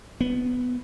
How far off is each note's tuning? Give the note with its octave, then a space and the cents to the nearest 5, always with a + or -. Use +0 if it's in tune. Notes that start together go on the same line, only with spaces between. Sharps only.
B3 +10